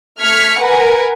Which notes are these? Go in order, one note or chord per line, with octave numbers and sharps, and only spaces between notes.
A3 F6 G#6 B6 C#7
A#4 B4 F#5 G#5